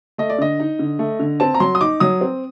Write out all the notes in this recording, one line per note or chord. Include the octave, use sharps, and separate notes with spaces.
A3 D#5
D5
D3 D#5
D#4
D3
A3
D3
C4 A5
A#5
F#3 C6
D#6
D#4 D6
F#3 D#6
C4